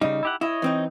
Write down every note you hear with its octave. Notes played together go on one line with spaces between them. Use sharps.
C#3 G3 D#4
E4 G4 F#5
E4 C#5 D#5
E3 C4 D#4